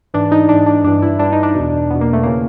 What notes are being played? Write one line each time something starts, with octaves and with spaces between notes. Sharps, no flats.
G#2 E3 D4
D#4
G#2 E3 D4
D4
G2 E3 D4
E4
G2 E3 D4
D#4
D4
B2
E2
E2 B2 B3
A#3
A3
C#3 E3 A#3